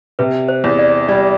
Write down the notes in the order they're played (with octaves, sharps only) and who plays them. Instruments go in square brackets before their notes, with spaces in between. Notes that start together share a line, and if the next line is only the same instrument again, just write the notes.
[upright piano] C3 [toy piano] B4
[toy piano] C5
[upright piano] E2
[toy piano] D5
[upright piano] G3 [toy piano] D5